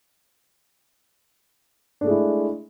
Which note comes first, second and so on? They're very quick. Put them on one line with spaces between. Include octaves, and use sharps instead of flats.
D4 A3 G#3 E4